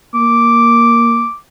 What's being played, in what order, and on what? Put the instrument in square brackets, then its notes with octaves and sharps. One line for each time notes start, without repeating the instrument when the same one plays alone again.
[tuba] A#3 [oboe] D6